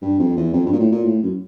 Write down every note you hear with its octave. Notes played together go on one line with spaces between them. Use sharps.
G2
F2
E2
F2
G2
A#2
A2
A#2
A2
F#2